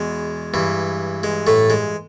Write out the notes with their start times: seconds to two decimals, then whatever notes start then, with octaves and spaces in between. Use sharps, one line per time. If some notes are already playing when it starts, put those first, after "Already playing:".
Already playing: E2 B2 G#3
0.54 G2 E3
1.23 G#3
1.47 A2 A3
1.70 G#3